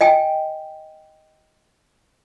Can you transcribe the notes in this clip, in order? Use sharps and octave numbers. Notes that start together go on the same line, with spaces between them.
D#5 G5 G#5